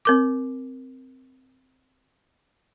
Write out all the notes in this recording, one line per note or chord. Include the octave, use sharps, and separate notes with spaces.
C4 A#4 D6